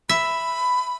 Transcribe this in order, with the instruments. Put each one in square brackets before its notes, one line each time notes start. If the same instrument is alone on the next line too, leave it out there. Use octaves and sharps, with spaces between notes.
[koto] E5 [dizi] B5